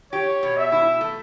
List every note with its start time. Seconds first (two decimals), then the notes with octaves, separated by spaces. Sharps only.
0.12 G4 C#5
0.43 B2
0.57 E5
0.72 E4
1.01 A3